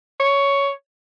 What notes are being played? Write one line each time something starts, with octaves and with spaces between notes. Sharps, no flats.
C#5